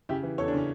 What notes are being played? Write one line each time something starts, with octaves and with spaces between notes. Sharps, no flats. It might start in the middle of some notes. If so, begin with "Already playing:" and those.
C#3 E4 G4
E3
E2 A4 C#5
D4
C#3 C#4